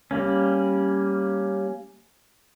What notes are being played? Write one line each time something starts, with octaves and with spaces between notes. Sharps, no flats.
G3 A#3 C#4